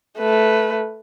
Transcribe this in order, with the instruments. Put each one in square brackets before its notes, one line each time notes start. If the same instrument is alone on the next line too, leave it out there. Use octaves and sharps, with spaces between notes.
[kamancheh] A3 B4